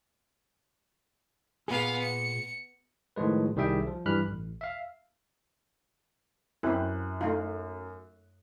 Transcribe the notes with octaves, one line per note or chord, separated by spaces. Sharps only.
A#2 B3 G#4 F5
C#7
A2 D#3 F3 G#3 B4
C2 D#3 G3 G#4 E5 G5
F3
G2 E3 G3 B5 F6 F#6
A1
E5 F5
F#2 C4 E4 F#6
A3 D#4 F4